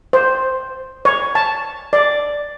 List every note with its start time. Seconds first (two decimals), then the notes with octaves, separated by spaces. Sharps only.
0.13 C5
1.05 C#5
1.35 A5
1.93 D5